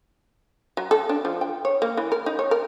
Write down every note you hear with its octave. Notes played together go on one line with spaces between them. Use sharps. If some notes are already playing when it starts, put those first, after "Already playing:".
F#3
A4
D4
F3
G5
C#5
A#3
E3
A#4
D#4
C#5
A#4